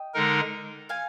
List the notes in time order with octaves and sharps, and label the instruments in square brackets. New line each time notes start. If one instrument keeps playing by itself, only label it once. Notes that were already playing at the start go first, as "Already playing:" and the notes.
Already playing: [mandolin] D#5 G5
[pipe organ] D3 G#3 D#4 A#4
[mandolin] F5 G#5